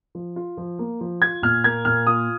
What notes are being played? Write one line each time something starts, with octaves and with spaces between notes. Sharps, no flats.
F3
F4
F3
A#3
F3
F4 G#6
A#2 F6
A#3 G#6
A#2 F6
F4 D#6